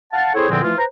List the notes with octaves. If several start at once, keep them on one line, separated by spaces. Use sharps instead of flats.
F5 F#5 A5
C4 E4 G#4 A4 C5 C#5
E2 A#2 D3 F3 G#3 C4
E3 F3 A3 F4
B4 C5 A#5